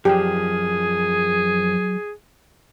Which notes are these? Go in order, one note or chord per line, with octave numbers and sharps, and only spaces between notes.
F#2 F3 F#3 G4 G#4